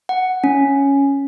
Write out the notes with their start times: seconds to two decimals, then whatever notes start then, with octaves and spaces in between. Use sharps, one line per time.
0.09 F#5
0.44 C#4